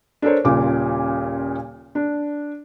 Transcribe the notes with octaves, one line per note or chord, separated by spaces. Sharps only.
D4 A4 A#4 C5 C#5
D#1 A#2 C#3 F4 D6
D4